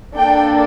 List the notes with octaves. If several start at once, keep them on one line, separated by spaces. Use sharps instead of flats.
A#3 D4 A4 G5